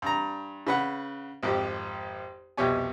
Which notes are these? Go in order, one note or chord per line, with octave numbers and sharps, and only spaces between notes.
G2 A#5
C#3 B4 F#5
G#1 F2 G4
C2 F2 B2 G4 C#5 G#5